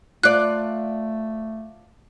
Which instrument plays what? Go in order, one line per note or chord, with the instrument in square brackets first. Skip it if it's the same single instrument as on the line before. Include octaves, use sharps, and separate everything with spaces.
[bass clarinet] A3 [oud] F4 D5 [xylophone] F#6